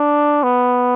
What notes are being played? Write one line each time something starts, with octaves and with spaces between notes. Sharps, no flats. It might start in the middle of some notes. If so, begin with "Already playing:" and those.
Already playing: D4
B3